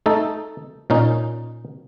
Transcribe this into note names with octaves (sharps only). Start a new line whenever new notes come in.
A3 D#4 A4
A#2 C#4 D#4